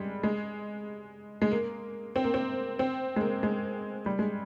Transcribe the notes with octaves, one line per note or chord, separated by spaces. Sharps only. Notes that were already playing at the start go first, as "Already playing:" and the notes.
Already playing: G3 G#3
G#3
G#3
A#3
C4
A#3
C4
C4
G#3
A#3
G#3
G3
G#3